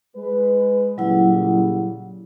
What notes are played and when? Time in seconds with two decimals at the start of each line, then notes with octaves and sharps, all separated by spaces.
0.16 G#3 B4
0.98 A#2 C#3 F#3 G3 E4 F#5